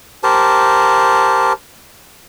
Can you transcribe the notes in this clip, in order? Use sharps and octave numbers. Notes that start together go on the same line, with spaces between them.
G4 A#4 C5 A5